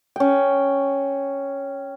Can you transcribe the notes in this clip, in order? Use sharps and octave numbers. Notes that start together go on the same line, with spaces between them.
C#4 G5